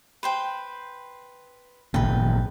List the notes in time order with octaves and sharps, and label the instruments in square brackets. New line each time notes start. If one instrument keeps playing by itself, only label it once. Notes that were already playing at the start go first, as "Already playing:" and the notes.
[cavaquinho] B4 C5 G5
[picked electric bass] G#1 A#2 C#3 [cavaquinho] B4 G5